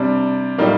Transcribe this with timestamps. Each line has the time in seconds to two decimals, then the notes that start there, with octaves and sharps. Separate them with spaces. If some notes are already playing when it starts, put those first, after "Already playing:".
Already playing: C3 G3 D4
0.58 A2 G3 A#3 D#4